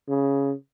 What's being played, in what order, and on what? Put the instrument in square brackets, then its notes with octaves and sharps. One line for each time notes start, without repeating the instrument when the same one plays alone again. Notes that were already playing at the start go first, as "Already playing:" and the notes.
[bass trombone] C#3